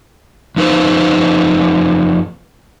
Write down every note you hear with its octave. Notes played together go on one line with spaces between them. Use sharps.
F2 D#4 B4 C5